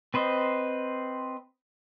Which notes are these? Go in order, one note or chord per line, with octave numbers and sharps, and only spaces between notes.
C4 B4 C5 D#5